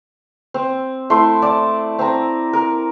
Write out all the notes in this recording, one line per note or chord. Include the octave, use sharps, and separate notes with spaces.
C4
A3 E4 C6
D5 A5
C4 A#5
A#4